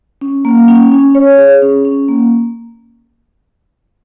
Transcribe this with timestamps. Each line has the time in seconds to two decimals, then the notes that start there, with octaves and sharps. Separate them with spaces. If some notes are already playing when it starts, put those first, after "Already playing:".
0.21 C#4
0.45 A#3
0.68 C#4
0.92 C#4
1.15 C#5
1.38 G#4
1.62 C#4
1.85 C#4
2.09 A#3